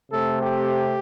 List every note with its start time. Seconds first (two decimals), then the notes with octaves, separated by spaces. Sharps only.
0.12 C3 A3 C4 A4
0.41 G4